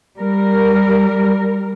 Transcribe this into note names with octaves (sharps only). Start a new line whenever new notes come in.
G3 A#4